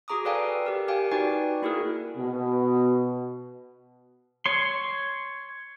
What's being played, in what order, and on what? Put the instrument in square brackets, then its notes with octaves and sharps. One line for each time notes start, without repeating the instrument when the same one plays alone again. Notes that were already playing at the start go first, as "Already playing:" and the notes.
[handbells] F#4 G#4 A#5 D6 D#6
A4 B4 D5 F5 G5 G#5
G4 A#4
G4 F5 G5 G#5
D#4 F#4 B4 D5 G5 G#5
A#3 E4 F#4 G#4 A#4
[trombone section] B2
[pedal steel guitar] C#5 C6